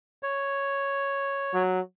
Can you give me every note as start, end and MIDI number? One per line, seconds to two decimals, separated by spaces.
0.23 1.63 73
1.54 1.80 54